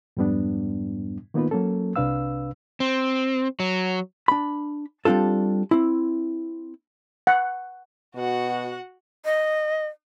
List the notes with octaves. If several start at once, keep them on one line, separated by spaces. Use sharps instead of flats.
F2 G#2 G3 B3 D4
D#3 A#3 B3 D#4 F4 B4
F#3 A#3 C#4 A4
C2 C3 D4 B4 F5 E6
C4
F#3
D4 B5
G3 C4 D4 F4 A4
C4 E4
F#5
B2 F#4 F#5
D#5